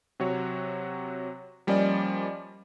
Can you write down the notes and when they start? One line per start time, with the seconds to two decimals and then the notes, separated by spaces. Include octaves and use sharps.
0.20 C3 F#3 F#4 C#5
1.67 F3 G3 A#3 C#4 D5 D#5